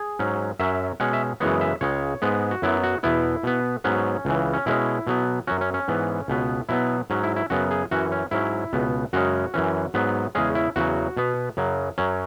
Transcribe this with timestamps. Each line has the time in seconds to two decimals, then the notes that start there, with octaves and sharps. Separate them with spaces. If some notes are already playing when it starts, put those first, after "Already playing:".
Already playing: G#4
0.19 G#2 F#3 C#4
0.59 F#2 F#3 C#4 E5
1.00 B2 G#3 C#4 F#5
1.13 E5
1.40 F#2 C#3 E3 G#3 B3 C#5
1.61 E5
1.81 C#2 C#3 G#3 C#5
2.22 G#2 G#3 B3
2.51 F#4
2.62 F#2 F#3 B3 E4
2.83 F#4
3.03 E2 B2 B3 E4
3.43 B2 B3
3.84 G#2 F#3 B3 C#4
4.25 C#2 C#3 E3
4.54 C#4
4.66 B2 G#3 C#4 E4
5.07 B2 F#3 B3
5.47 F#2 F#3 C#4 F#4
5.61 C#4
5.74 C#4
5.88 G#2 E3 B3
6.28 C#2 B2 B3
6.69 B2 F#3 B3 E4
7.10 G#2 F#3 C#4
7.23 E4
7.36 E4
7.50 F#2 C#3 F#3 B3 F#4
7.71 G#4
7.91 F#2 E3 C#4 F#4
8.12 C#4
8.31 G#2 F#3 C#4 E4
8.73 C#2 B2 B3
9.13 F#2 C#3 G#3 C#4 F#4
9.54 F#2 E3 C#4
9.94 G#2 F#3 B3
10.35 E2 C#3 G#3 C#4 G#4
10.55 E4
10.76 E2 C#3 F#3 F#4
11.17 B2 B3
11.57 F#2 C#3 F#3
11.98 F#2 F#3 C#4